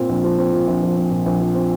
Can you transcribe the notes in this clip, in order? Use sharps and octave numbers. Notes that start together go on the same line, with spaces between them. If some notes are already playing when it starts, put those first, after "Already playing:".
Already playing: A#2 C4
A#1
F3
C4
A#2
A#1
F3
C4
A#2
A#1
F3
C4